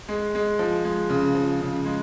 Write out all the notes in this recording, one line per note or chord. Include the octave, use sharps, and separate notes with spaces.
G#3
G#3
F3
G#3
C#3
F3
C#3
G#3